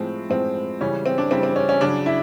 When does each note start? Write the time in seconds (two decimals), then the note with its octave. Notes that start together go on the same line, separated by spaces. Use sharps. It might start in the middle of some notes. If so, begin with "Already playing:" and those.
Already playing: A2 F3 G#3 C4
0.30 A2 F3 G#3 C4
0.81 C#3 E3 G3 C#4
1.06 C4
1.18 D4
1.31 C#3 E3 G3 C4
1.43 C4
1.56 C#4
1.69 C#4
1.81 C#3 F#3 D4
2.06 E4